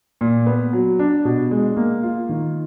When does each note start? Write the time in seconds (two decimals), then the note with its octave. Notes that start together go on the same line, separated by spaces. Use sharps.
0.21 A#2
0.47 B3
0.73 F#3
0.99 D4
1.25 B2
1.51 G#3
1.77 A#3
2.03 F4
2.29 D#3